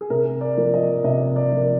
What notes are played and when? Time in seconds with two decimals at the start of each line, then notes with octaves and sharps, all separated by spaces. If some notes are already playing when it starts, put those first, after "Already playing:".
0.01 G#4
0.10 C3 A#4
0.41 D5
0.57 F3 A#3
0.74 D#5
1.04 C3 D#5
1.36 D5
1.52 F3 A#3